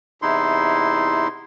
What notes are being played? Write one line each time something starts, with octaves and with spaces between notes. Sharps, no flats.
E2 C3 D#4 E4 C6